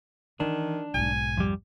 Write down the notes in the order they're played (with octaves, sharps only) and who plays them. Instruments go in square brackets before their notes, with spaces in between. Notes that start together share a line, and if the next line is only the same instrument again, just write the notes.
[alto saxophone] D#3 [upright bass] E3 [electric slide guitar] D4
[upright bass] B1 G#2 [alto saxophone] G#5
[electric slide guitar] F2 G3